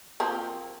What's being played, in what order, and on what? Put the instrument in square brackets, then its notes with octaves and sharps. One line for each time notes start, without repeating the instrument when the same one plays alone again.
[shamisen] F3 A#3 C4